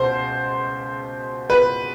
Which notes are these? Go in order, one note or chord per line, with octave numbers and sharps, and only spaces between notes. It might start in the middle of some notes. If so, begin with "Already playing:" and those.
Already playing: C#2 B2 C5
B4